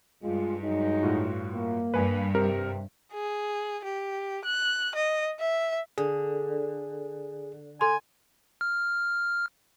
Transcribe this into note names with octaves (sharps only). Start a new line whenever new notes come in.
G2 G#3 F4
F#3 G#3 D#4
A2 F4 F#4
A#3
G2 B4 G#5 B5
C3 C4 G4 A#4
G#4
G4
F#6
D#5
E5
D3 G#4
A4 G#5 C6
F6